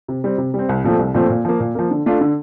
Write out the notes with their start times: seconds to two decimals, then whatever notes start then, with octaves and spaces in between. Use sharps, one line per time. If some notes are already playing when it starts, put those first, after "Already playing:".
0.08 C3
0.24 G3 C4
0.38 C3
0.54 G3 C4
0.69 C2
0.84 A#2 F3 A3 C4
0.99 C2
1.14 A#2 F3 A3 C4
1.30 A#2
1.45 F3 A#3
1.60 A#2
1.75 F3 A#3
1.91 D3
2.06 A3 D4 F4
2.21 D3